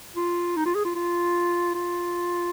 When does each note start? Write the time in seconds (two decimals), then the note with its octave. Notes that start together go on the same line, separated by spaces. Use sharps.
0.16 F4
0.56 D#4
0.66 F4
0.75 G#4
0.85 F4
0.96 F4
1.74 F4